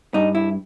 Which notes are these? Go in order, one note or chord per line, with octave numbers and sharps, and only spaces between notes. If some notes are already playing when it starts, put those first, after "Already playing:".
G2 D#4
E4